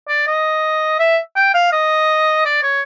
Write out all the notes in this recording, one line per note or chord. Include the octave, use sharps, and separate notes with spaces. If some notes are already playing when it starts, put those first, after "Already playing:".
D5
D#5
E5
G5
F5
D#5
D5
C#5